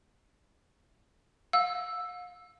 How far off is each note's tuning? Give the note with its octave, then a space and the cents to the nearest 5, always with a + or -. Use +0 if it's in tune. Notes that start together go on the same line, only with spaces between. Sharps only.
F5 +40 E6 +5